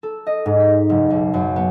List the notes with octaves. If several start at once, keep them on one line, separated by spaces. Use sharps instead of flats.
A4
D#5
G#2
B6
F#1
B1
F#2
B3